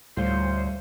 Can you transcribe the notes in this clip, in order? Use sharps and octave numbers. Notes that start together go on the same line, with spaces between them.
D2 A2 F3 G3 C#4 C5 F5 G6